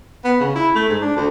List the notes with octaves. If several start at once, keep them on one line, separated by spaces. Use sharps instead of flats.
B3
C#3
E4
A3
G#2
D4
D2